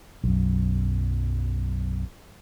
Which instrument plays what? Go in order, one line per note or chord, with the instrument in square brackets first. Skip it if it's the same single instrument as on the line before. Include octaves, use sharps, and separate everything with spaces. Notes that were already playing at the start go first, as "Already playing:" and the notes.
[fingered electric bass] B1 F#2